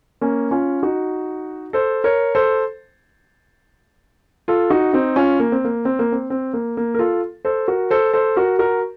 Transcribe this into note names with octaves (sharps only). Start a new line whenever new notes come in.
A#3 C#4
C#4 F4
D#4 F#4
A4 C5
A#4 C#5
A4 C5
F4 A4
D#4 F#4
C4 D#4
C#4 F4
A#3
C4
A#3
C4
A#3
C4
C4
A#3
A#3
A#4
F4 A4
A4 C5
F#4 A#4
A4 C5
A4 C5
F#4 A#4
F#4 A#4